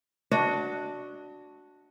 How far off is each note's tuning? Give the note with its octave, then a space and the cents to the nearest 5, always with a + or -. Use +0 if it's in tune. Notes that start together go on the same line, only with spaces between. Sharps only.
D4 +0 F#4 +0 D#5 +35